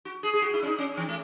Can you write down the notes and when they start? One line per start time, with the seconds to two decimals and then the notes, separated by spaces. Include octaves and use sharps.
0.05 F#4
0.23 G#4
0.34 G#4
0.42 F#4
0.54 E4
0.63 C#4
0.67 D#4
0.78 C#4
0.97 E3
1.08 A3